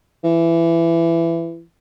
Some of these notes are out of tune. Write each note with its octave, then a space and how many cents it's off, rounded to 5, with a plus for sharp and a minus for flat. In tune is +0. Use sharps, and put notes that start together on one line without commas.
E3 +20